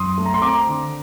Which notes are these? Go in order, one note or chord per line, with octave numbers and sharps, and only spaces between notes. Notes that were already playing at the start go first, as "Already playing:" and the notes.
Already playing: F#2 C6 D#6
A3
A#5
C6
C4 A#5 D6
D3